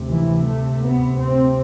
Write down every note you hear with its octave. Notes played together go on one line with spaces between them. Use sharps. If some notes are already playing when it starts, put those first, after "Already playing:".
Already playing: D2 C3
E3
A3
B3
C4